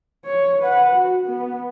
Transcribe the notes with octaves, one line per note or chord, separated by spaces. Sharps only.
C#5
B4 F#5
F#4
B3